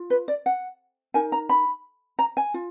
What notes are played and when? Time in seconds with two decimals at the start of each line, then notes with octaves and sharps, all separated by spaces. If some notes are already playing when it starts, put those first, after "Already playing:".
Already playing: F4
0.10 B4
0.28 D5
0.46 F#5
1.14 D#4 A#4 G#5
1.32 A#5
1.49 B5
2.19 A#5
2.37 G#5
2.54 F4